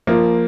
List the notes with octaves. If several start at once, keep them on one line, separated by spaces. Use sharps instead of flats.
F3 A#3